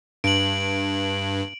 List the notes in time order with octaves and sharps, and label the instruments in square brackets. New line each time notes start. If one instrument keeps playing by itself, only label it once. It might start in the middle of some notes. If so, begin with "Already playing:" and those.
[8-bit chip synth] G2 [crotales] D7 F#7